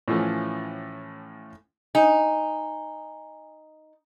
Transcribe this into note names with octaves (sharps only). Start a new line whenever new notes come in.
A2 E3 F3 A3 C#4
D#4 G#5